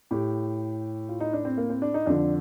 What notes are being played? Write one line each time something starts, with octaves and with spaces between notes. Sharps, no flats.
A2 G4
F4
D#4
D4
C4
A#3
C4
D4
D#4
F2 D3 D4